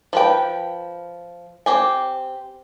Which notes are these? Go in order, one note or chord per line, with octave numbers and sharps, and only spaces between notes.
F3 B4 G5
C4 G4 G#5